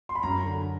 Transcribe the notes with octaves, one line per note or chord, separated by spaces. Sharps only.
C6
B5
F#2 A#5
D3